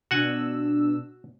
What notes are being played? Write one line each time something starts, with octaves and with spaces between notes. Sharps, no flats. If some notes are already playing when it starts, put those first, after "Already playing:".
B2 D4 F#4 F#5 G#5 E6